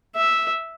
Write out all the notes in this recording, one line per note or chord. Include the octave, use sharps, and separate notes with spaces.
E5